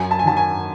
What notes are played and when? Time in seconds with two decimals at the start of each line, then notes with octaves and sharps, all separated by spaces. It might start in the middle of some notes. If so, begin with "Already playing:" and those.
Already playing: F#2 G#5
0.11 A5
0.19 G#5
0.24 D#3 F#3 A5
0.37 G#5